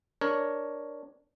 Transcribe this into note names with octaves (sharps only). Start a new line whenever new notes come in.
D4 A#4 C#5